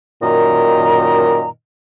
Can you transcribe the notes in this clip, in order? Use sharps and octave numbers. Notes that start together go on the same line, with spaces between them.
F#2 A#2 D#3 D#5 A#5